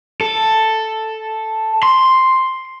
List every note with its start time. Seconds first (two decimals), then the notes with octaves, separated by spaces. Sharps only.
0.21 A4
1.83 C6